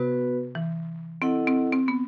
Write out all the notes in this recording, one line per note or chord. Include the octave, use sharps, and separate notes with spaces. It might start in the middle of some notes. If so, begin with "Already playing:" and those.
Already playing: C3 B3 F#4 B4
E3
C4 E4 A4 D#5 F#5
C4
C4
B3